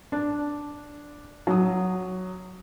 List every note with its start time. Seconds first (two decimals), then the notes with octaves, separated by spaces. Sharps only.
0.12 D4
1.47 F#3 D#6